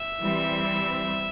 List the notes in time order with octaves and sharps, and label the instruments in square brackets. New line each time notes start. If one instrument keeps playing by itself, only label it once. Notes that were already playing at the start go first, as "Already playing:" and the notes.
Already playing: [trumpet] E5
[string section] E3 G3 C4 E4